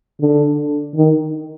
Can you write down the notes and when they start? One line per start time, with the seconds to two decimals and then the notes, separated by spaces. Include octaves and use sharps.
0.20 D3
0.95 D#3